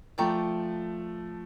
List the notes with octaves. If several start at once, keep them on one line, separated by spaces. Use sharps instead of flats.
F3 A3 D5 G5 A#5 C#6